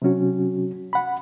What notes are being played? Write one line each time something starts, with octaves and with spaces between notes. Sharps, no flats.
C3 F#3 C#4 F#4
F#5 B5